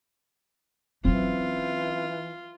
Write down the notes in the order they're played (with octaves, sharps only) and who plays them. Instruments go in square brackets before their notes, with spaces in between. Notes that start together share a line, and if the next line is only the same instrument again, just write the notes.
[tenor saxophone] E3 [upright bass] F#3 C#4 [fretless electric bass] C4 [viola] F4